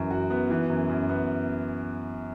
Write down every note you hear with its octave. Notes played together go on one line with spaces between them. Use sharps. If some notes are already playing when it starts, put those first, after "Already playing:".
Already playing: F#2 E3
F#4
B3
E3
F#2
F#2
B3